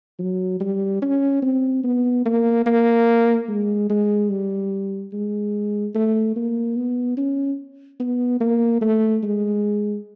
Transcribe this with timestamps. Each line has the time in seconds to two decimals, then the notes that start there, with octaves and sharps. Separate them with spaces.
0.19 F#3
0.61 G3
1.02 C#4
1.42 C4
1.84 B3
2.26 A#3
2.66 A#3
3.49 G#3
3.90 G#3
4.30 G3
5.13 G#3
5.95 A3
6.36 A#3
6.76 B3
7.17 C#4
8.00 B3
8.41 A#3
8.81 A3
9.23 G#3